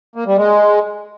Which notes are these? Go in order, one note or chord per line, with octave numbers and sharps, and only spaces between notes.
A#3
G3
G#3